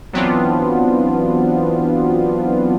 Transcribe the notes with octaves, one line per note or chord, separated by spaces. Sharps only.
E3 F#3 B3 C4 D4 F4